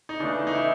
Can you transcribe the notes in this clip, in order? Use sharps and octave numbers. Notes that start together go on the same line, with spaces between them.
D#4
C#3 E3 A3 D4
D#4
E4